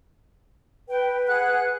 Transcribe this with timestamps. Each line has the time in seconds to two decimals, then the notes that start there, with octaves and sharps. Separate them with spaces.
0.89 B4 G5
1.28 G#4 F#5 F#6